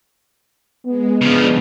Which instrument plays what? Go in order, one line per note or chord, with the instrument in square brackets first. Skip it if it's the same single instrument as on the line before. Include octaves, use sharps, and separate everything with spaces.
[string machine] G#3 [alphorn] B3
[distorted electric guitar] C#3 F3 [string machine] G#3 D4